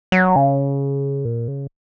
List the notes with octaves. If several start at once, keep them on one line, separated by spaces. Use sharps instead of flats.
F#3
C#3
A#2
C#3